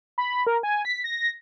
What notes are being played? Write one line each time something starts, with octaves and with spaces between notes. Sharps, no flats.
B5
A#4
G#5
B6
A#6